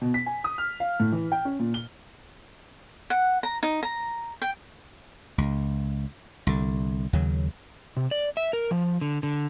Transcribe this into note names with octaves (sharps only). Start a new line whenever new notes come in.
B2
B6
G#5
D#6
F6
F5
A2
E3
G5
C#4
A#2
G7
F#5
A#5
D#4
A#5
G5
C#2
C2 D3
D#2 C#3 F#3
C3
D5
E5
A#4
F3
D3
D3